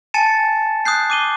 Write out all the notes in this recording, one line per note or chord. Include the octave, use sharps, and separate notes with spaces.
G#5 A5 A6 C#7 D#7 E7
D#6 F#6 G6 C7
D6 D#7 G7